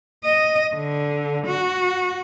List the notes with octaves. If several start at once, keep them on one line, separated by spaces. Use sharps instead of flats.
D#5
D3
F#4